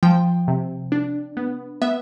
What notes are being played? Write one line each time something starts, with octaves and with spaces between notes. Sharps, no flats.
F3 G5
C3
D4
B3
B3 E5